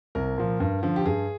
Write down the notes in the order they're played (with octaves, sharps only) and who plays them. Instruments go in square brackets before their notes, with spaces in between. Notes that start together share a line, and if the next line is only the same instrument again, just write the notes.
[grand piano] C2 A#4
A#2 F3
G2
D3 F3
G4
G2 G#4